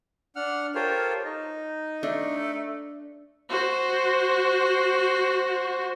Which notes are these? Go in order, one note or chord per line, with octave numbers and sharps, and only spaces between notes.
D4 F#5 F6
F4 G4 A4 A#4 C5 C#5
D#4 D#5
A3 D4
F#4 C5